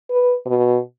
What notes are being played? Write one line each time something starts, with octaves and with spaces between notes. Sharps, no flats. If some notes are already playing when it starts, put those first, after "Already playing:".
B4
B2